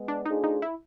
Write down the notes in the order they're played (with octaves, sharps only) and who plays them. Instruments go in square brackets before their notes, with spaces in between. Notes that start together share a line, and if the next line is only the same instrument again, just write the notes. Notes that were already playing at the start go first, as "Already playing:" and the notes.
Already playing: [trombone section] G#3 B3
[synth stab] D4
[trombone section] A3 D4 F4 G#4 C5 [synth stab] D#4
[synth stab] D#4
E4